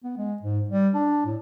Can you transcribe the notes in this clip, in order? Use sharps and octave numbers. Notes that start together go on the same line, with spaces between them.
B3
G#3
G#2
G3
D4
A2